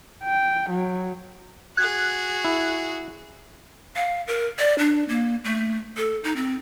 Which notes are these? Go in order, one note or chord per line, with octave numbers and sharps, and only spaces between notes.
G5
F#3
F#4 G#4 F#6 G#6
E4
F5
A#4
D5
D4
A#3
A3
A4
D#4
C4